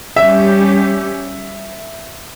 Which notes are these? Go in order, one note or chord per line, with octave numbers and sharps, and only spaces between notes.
G3 C#4 G4 E5